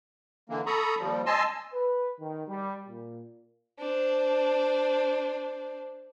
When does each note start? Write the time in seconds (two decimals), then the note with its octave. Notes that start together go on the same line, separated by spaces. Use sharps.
0.50 D3 E3 A#3
0.66 A4 A#5 B5 C#6 D#6
0.99 D#2 F3 G3
1.26 D#5 G#5 A5 C6 E6
1.74 B4
2.20 D#3
2.48 G3
2.88 A#2
3.79 D4 C5